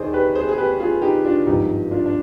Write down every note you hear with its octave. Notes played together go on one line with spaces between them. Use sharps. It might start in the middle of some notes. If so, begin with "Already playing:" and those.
Already playing: D#2 D#3 G#4 C5 D5 D#5
G4 B4
G#4 C5
G#4
G4 B4
F4 G#4
D#4 G4
D4 F4
G#1 G2 F3 D#4 G4
D4 F4
D4